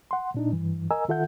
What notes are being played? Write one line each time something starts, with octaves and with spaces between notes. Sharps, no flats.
F#5 C6
A#2 D4 D#4
G2 E3
A#4 D#5 G#5 A#5 E6
D#3 F4 A4 E5 F#5 G6